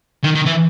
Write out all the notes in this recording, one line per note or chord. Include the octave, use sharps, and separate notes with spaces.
D#3
D#3
E3